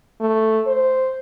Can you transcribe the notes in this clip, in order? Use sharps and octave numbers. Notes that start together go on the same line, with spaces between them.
A3
C5